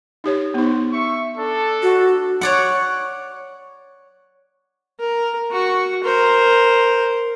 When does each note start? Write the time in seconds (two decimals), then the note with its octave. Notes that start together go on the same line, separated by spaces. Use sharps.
0.24 D#4 G4 C#5
0.54 B3 D#4 F#4 C5
0.91 E5 C#6
1.38 D4 A4
1.83 F#4
2.41 C#5 D5 F#5
5.00 A#4
5.51 F#4 C#6
6.03 A#4 C5